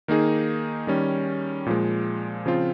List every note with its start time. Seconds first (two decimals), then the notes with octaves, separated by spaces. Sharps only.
0.08 D#3 A#3 D#4 G#4
0.87 D#3 G3 C#4
1.66 A#2 F3 G#3
2.46 C#3 F3 C4 F4